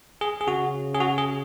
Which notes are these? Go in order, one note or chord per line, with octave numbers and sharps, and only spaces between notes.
G#4
G#4
C#3 F#4
G#4
F#4
G#4